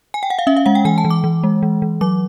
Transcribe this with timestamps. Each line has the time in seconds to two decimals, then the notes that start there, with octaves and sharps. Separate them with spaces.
0.14 G#5
0.23 G5
0.30 F#5
0.39 F5
0.47 C#4 E5
0.56 F5
0.66 G#3 F#5
0.75 G5
0.85 E3 G#5
0.98 A5
1.05 E3
1.10 D6
1.24 E3
1.44 G#3
1.63 E3
1.82 E3
2.01 F#3 D6